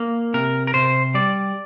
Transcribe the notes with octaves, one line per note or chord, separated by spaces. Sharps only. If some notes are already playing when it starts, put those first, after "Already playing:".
Already playing: A#3
C3 A#4
A#4
C3 C5
G3 D5